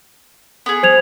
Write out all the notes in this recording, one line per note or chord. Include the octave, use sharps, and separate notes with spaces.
B3 G#4
C5 G#6 F7